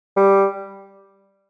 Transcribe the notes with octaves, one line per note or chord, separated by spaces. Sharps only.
G3